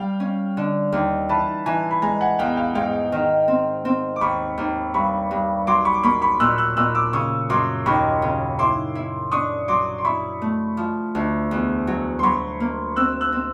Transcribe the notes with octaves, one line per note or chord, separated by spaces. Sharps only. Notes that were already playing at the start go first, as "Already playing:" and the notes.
Already playing: G3 F5 G5
C#4
D3
D#2
E3 A5 B5
E3 G#5 A#5
B5
G#3 G#5 A#5
F#5 G#5
E2 F5 G5
F5 G5
G#2 F5 G5
D#3
C4
C4
D6
D#2 B5 C#6
D#2
G2 B5 C#6
G2
F#3 C6 D6
B5 C#6
D6
A#3 B5 C#6
B5 C#6
A#2 E6 F#6
E6 F#6
A#2 E6 F#6
D6 E6
C#3 C#6 D#6
F#2 C6 D6
D#2 B5 C#6
C#3
E4 C6 D6
E4
D4 C#6 D#6
F#3 C6 D6
C6
E4 B5 C#6
A3
F3
D2
E2
F#3
C6
F#3 B5 C#6
A#3
C4 E6 F#6
E6 F#6
C4